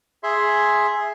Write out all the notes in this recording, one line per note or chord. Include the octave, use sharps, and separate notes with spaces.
G#4 E5 C6